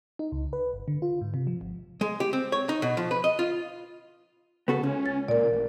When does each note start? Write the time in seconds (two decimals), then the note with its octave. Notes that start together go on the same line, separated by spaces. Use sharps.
0.19 D#4
0.32 C#2
0.53 B4
0.73 G1
0.88 D3
1.02 F4
1.21 G#2
1.34 C3
1.47 F3
1.61 G1
2.01 G#3
2.20 G4
2.33 C4
2.52 C#5
2.69 D#4
2.82 B2
2.97 F3
3.11 B4
3.24 D#5
3.39 F4
4.68 C#3 B3 F#4 A4
4.83 C#2 C#4
5.06 A6
5.28 A#2 A#4 D5
5.52 A1